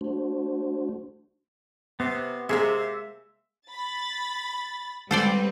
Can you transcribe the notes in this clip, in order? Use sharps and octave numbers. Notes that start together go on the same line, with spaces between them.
A3 D4 F#4 C5
C3 B3
C3 G#3 A#3 G#4 E5
B5 A6
G3 G#3 C4 A4 B4 C5 D5